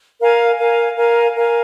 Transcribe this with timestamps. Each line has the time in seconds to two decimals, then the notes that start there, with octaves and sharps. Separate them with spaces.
0.21 A#4 F5 G#5
0.59 A#4 F5 G#5
0.97 A#4 F5 G#5
1.35 A#4 F5 G#5